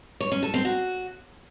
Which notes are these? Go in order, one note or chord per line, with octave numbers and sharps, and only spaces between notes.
C#5
C#4
A4
C4
F#4